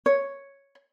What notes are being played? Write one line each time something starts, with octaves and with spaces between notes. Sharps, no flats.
C#5